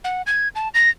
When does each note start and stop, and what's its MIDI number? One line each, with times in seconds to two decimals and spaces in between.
0.04 0.22 78
0.27 0.48 92
0.55 0.69 81
0.74 0.89 94